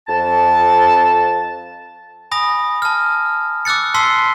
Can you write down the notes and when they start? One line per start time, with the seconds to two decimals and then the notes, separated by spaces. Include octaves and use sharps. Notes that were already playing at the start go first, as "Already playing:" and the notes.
0.08 F2 A5
2.31 G#5 B5 D#6 A#6
2.82 A5 F6
3.65 D6 E6 F#6 A6 C#7
3.94 A5 C6 E6 B6 C7 G7